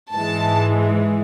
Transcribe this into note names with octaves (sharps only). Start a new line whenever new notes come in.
G#2 E3 G#3 A5